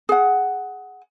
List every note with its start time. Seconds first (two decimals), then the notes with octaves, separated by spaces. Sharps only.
0.09 G#4 F#5